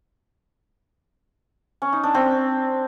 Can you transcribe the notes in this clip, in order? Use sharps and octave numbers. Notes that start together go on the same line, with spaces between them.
C#4
D#4
D4
C4